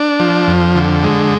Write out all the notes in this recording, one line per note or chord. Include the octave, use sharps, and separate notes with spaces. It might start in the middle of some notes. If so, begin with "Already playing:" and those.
Already playing: D4
F3
F2
D3
G#3